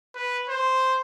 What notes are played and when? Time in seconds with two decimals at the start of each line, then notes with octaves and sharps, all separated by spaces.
0.15 B4
0.49 C5